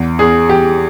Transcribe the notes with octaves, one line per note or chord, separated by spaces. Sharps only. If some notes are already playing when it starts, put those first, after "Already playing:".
Already playing: E2
E2 G#4
E2 G4